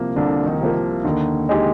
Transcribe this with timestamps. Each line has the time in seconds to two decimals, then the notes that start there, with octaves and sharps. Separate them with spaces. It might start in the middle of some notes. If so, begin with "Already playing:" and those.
Already playing: C2 C3 F3 A#3
0.16 C2 D3 D4
0.46 D#3 D#4
0.60 C3 F3 A#3
1.04 D#2 D3 D#3
1.49 G#3 D#4 G4